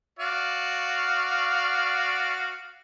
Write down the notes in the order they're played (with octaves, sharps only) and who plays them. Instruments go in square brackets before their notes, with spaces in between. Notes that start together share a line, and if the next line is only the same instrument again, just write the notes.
[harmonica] F#4 D5 F5